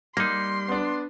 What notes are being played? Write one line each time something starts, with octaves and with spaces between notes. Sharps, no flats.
G3 A#3 D#4 C6
B3 D4